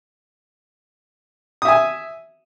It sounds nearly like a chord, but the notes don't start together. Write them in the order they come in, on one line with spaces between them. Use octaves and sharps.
D#6 E5 G#5